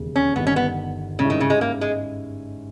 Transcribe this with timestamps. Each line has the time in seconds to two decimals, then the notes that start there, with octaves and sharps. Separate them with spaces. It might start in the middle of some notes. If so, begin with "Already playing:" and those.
Already playing: E1 D#2 C#3
0.16 C#4
0.36 G1 G2 D#3 B3
0.47 C#4
0.56 B3
1.19 G#2 C#3 G3 C#4 E4
1.30 D#3
1.40 C#3
1.50 G#3
1.61 A#3
1.81 G#3